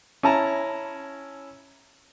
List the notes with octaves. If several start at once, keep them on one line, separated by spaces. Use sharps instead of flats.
C#4 E4 A5 A#5